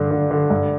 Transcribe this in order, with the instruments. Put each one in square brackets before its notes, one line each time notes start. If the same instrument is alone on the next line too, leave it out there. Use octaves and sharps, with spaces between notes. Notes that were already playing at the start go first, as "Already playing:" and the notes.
Already playing: [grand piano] G2 D3
D3
D3
G2